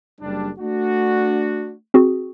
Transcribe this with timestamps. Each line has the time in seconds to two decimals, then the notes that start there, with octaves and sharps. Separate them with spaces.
0.21 F#1 G3 D4
0.59 A3 D4 F#4
1.94 C4 F#4 G#4